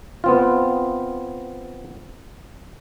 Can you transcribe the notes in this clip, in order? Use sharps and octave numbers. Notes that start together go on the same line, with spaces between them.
B3 C4 F4